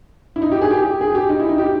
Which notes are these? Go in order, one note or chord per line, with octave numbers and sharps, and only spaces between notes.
E4
D#4
G4
G#4
G4
G4
G#4
G4
D#4
E4
D#4
G4